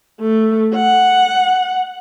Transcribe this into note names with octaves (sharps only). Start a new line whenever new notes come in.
A3
F#5